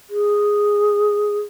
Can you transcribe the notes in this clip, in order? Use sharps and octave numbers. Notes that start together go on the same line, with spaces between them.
G#4